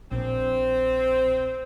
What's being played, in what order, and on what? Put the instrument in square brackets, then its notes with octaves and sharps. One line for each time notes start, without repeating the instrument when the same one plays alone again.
[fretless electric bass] A#1 [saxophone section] C4